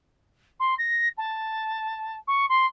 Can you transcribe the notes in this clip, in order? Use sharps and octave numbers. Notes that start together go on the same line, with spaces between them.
C6
A#6
A5
C#6
C6